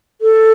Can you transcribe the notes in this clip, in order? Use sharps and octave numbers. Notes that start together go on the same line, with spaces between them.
A4